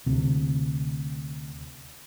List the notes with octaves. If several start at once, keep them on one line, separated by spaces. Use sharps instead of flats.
D2 C3